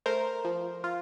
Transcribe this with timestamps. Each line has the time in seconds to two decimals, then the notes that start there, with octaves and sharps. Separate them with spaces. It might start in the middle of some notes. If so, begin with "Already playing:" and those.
0.06 A3 A#4 C5
0.45 F3
0.84 F4